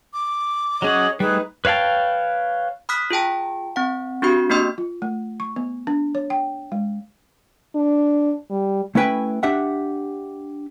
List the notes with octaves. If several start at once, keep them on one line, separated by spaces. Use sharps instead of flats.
D6
F#3 C#4 G#4 C#5 D#5 F#5
G3 A3 D#4 G#4 B4 F#6
B4 C#5 F5 G5 A5
B5 D#6 F6 F#6 B6
F4 G#4 G5 A5
C4 F#5
C4 D4 F#4 G4 B5
A#3 B3 D4 D#5 C6
F4
A3
C#6
B3
D4
C#5
G5
G#3
D4
G3
A3 C#4 E4 B4 G5 G#5
D4 G4 E5 F#5